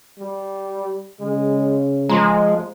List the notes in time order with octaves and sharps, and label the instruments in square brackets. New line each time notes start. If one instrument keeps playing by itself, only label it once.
[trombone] G3
[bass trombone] C#3 [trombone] G#3
[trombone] F3 [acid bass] G#3 [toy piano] A#5 C6